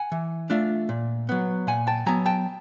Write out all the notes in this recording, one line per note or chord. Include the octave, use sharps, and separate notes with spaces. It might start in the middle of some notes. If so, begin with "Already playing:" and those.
Already playing: F#5 G#5
E3
A3 D4 F4
A#2
F#3 B3
A#2 F#5 G#5
G5 A5
F#3 B3 G#5 A#5
G5 A5